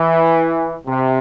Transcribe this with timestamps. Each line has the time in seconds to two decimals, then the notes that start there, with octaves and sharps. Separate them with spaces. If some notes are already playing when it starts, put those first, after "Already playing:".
Already playing: E3
0.87 C3